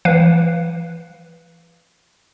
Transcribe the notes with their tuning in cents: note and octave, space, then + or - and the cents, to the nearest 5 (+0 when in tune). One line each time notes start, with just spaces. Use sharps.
E3 +45 B4 +0 F5 +0